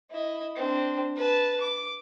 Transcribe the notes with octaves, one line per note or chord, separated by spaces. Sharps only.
E4 D#5
C4 D4
B4 A5
D6